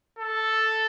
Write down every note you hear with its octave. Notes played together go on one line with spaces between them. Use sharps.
A4